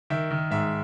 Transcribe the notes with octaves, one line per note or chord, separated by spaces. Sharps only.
D#3 E5
D#3
G#2 E5